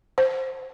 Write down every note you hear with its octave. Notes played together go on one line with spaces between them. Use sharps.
C5